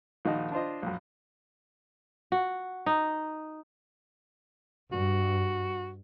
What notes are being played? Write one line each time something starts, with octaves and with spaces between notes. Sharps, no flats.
A#1 D#3 D#4 F#4 D#5 A5
D4 F4 C5 D#5
A#1 F#2
F#4
D#4
G2 F#4